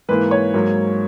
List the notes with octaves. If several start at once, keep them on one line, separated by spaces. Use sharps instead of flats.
G#2 E3 A#3 B4
C#5
G#2 F#3 A#3